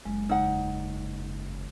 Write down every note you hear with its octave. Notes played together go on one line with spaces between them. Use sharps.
F#1 G#3
E2 C#3 D#4 F#5